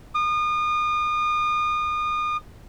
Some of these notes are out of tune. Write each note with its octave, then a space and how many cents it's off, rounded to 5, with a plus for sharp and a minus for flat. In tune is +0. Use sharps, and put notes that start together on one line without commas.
D#6 -35